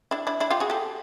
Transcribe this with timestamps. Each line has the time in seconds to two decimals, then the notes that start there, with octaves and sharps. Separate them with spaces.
0.11 D4 E4
0.27 D4 E4
0.40 D4 E4
0.50 F4 G4
0.60 F#4 G#4
0.70 G4 A4